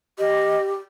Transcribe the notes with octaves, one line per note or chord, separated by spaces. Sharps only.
G4 D#5